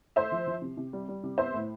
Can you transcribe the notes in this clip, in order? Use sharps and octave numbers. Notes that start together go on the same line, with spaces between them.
A3 C5 E5
F3
F3
C3
C3
G3
G3
C3
B3 C5 E5
A2